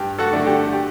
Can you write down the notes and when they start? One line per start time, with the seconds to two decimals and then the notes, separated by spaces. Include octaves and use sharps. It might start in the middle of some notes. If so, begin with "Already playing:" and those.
Already playing: G2 G4
0.19 F#4 A4
0.33 D3 A3 D4
0.46 G4
0.73 G4